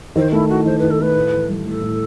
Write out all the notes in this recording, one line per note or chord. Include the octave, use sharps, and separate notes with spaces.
D#3 C5
A3 E4
E4 F#4
D#3 C5
D#3 B4
A4
A3 B4
A2
E3
G3
A2 A4
A2